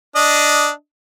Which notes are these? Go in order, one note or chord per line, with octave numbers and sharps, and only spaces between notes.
D4 D#5